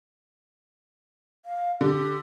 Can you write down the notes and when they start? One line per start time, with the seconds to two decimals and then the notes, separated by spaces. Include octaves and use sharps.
1.45 F5
1.81 D3 G4